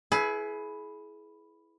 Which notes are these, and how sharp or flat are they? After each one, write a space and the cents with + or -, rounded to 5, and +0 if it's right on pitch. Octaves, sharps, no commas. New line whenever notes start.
E4 +0 G#4 +30 B4 +0